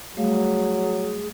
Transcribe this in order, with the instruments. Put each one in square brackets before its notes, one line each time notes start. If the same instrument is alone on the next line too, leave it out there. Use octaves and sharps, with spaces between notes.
[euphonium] F#3 [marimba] G3 A3 F5 [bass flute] G#4